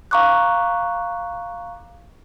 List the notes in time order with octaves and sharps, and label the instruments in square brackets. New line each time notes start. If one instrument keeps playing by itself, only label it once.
[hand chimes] F5 A#5 C#6 D6 F#6